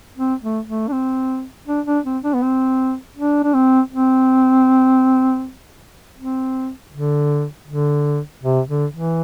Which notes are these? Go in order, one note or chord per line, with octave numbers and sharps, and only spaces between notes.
C4
A3
A3
D4
C4
D4
D4
C4
D4
B3
C4
D4
D4
C4
C4
C4
D3
D3
C3
D3
E3